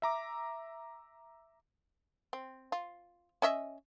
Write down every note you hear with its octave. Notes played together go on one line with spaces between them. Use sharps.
E5 A#5 D6
C4
F4
C#4 D#5 E5